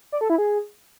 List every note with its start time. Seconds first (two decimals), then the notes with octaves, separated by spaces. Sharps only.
0.12 D5
0.21 A4
0.30 E4
0.38 G#4